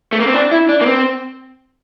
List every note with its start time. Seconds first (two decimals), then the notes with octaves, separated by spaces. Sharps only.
0.13 A3
0.20 A#3
0.27 C4
0.34 D4
0.51 E4
0.69 D4
0.81 A#3
0.86 C4